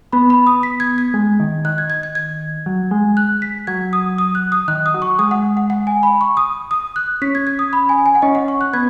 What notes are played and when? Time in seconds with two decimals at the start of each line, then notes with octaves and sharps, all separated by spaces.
0.12 B3 B5
0.30 B5
0.47 D#6
0.63 B6
0.80 G#6
0.98 G#6
1.14 G#3
1.40 D#3
1.65 D#3 F#6
1.78 G#6
1.90 G#6
2.03 G#6
2.15 G#6
2.66 F#3
2.91 G#3
3.17 F#6
3.42 B6
3.67 F#3 G#6
3.93 D#6
4.18 D#6
4.35 F#6
4.52 D#6
4.68 D#3 F#6
4.86 D#6
4.94 F#3
5.02 C#6
5.19 G#3 D#6
5.31 F#5
5.57 F#5
5.70 F#5
5.87 G#5
6.03 B5
6.21 C#6
6.37 D#6
6.71 D#6
6.96 F#6
7.22 C#4 B6
7.35 G#6
7.47 G#6
7.59 D#6
7.73 B5
7.89 G#5
8.06 G#5
8.15 F#5
8.22 C#4 D#5
8.35 F#5
8.48 C#6
8.61 F#6
8.73 B3 G#6